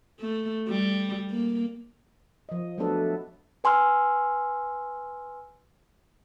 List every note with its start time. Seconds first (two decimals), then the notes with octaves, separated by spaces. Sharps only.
0.20 A3
0.68 G3
1.31 A#3
2.49 F3 D#5
2.78 F#3 A3 B3 D4 A4 B4
3.64 B4 G#5 C6 E6 F6